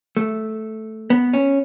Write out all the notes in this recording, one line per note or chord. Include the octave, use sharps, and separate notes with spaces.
A3
B3
C#4